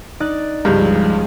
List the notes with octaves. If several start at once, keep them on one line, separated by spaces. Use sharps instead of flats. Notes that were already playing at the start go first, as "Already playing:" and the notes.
D#4 D5 F#6
C#2 G2 F3 G3 G#3 A#5 G6